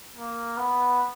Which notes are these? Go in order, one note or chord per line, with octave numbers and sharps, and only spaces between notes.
A#3
B3